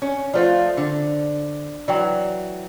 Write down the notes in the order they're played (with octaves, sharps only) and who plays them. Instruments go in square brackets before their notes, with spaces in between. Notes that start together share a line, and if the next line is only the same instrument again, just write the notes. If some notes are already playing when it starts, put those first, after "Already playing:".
[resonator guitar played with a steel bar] C#4 [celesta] C#5
[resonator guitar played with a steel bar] F3 A3 F4 [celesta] C5 D5
[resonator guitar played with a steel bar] D3
[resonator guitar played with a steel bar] E3 F#3 [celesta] D5 G5